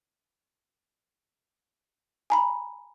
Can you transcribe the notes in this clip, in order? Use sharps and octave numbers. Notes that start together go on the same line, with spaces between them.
G#5 A#5 B5